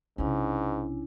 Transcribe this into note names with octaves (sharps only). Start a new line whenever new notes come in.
B1 G#2 C3 C#4 D4 E4